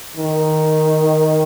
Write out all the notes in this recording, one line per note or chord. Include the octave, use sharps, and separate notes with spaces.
D#3